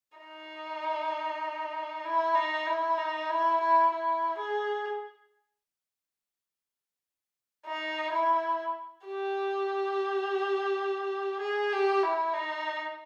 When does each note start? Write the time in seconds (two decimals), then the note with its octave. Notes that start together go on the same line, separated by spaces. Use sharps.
0.18 D#4
2.05 E4
2.35 D#4
2.67 E4
2.98 D#4
3.30 E4
3.61 E4
3.92 E4
4.38 G#4
7.66 D#4
8.12 E4
9.06 G4
11.40 G#4
11.72 G4
12.03 E4
12.34 D#4